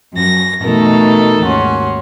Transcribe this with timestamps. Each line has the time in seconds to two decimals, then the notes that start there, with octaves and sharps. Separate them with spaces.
0.14 F#2 A#6
0.64 B2 E3 A3 D#4 A4 A#4
1.43 D#2 G#2 C#4 F#4 C6